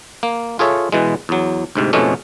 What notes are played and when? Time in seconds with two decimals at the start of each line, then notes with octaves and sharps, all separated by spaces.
0.23 A#3
0.59 F4 G#4 A4 C#5 E5
0.92 B2 E3 G#3
1.29 E2 F#3
1.75 D2 G#2 C3
1.93 F2 G#2 B2 G#3 A3 C#4